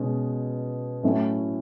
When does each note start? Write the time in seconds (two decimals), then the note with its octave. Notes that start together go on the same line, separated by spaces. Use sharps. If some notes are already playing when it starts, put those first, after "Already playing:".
Already playing: B2 G#3 C#4
1.03 A2 F#3 A3 C#4 E4